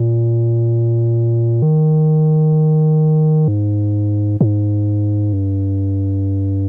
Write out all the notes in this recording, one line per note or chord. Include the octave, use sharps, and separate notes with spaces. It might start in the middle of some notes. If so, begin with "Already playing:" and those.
Already playing: A#2
D#3
G#2
G#2
G2